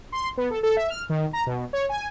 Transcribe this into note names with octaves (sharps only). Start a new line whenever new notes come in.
C6
B3
A4
A4
E5
F6
D#3
A#5
B2
C#5
G#5